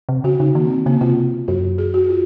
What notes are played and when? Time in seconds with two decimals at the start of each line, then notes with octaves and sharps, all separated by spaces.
0.09 C3
0.24 C#3 F#4
0.39 C#3 D#4
0.55 D#3 A#3
0.65 C4
0.86 C#3 A#3
1.01 C3 F4
1.48 F#2 F#4
1.78 G#4
1.94 F#4
2.09 F4